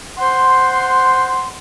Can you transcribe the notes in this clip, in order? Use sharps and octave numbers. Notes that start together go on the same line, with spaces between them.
C5 F#5 C6